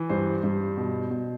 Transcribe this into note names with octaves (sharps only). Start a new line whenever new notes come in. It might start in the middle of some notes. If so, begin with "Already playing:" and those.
Already playing: E3
G2 C5
G2
B2
B2